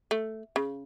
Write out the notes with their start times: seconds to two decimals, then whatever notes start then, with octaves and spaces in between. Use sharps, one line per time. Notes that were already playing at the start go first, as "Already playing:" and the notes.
0.11 A3
0.56 C#3